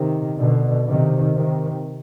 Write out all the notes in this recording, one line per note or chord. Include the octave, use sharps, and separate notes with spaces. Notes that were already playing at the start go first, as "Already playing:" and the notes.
Already playing: C3 D#3
B2 D3
C3 D#3
C3 D#3